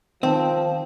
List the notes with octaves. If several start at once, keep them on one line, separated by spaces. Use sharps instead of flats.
D#3 F3 C4 G5 A5